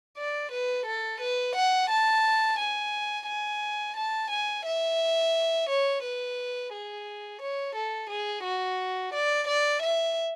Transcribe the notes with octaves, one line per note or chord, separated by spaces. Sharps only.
D5
B4
A4
B4
F#5
A5
G#5
G#5
A5
G#5
E5
C#5
B4
G#4
C#5
A4
G#4
F#4
D5
D5
E5